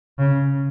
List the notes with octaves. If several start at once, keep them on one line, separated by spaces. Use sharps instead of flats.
C#3